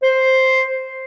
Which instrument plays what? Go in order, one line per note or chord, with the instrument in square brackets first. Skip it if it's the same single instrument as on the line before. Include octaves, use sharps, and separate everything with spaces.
[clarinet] C5